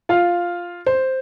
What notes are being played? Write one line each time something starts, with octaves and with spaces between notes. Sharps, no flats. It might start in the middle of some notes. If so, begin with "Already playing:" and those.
F4 F5
C5